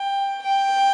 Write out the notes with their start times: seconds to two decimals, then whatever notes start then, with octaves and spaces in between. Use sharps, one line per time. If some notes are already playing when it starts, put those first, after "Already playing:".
Already playing: G5
0.43 G5